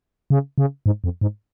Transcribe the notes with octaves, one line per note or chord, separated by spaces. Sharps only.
C#3
C#3
G#2
F2
G#2